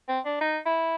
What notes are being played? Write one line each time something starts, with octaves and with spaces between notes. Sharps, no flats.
C4
D4
D#4
E4